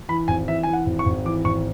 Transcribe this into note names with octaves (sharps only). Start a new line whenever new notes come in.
E3 B5
G#1 G#5
E3 E5
E3 G#5
F#5
G#1
C#6
G#1
E3 D6
G#1 C#6